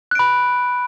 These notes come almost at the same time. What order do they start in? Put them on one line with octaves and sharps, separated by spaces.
F#6 D7 B5